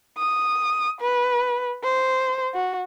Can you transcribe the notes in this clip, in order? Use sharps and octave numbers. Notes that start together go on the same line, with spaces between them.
D#6
B4
C5
F#4